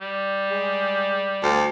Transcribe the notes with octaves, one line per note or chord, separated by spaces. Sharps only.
G3
G#3
D2